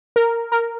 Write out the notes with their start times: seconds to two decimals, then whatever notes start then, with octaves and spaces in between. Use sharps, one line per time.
0.16 A#4
0.52 A#4